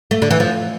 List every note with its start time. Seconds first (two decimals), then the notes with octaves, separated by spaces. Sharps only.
0.11 A3
0.22 D3
0.31 E3
0.40 F3